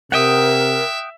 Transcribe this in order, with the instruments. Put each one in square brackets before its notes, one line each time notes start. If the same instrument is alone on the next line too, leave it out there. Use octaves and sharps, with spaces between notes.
[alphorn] C3 [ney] A#4 [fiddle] E5 [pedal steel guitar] F#5 G5 D#6